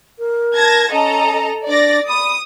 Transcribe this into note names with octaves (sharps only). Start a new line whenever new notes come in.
A#4
A5 G#6 A#6
C#4 A4 D#5 A#5
D4 D5 A6 A#6
B5 D#6